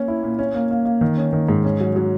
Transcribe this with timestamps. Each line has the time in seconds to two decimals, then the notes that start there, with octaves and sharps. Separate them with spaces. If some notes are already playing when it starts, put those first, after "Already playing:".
Already playing: A#3 C#4
0.08 E4
0.23 A#2
0.39 C#4
0.55 A#3
0.71 A#3
0.85 A#3
1.01 D#3
1.17 C#4
1.33 D#3
1.49 G#2
1.65 C#4
1.80 F#3
1.96 F#3